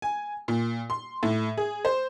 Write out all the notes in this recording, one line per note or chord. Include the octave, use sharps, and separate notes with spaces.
G#5
A#2
C6
A2
G#4
C5